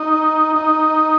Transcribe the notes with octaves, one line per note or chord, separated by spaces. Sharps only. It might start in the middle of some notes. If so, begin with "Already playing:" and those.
Already playing: D#4
D#4